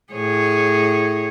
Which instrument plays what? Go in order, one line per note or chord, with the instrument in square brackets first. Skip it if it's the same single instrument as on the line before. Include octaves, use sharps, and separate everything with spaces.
[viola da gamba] A2 G#4 C#5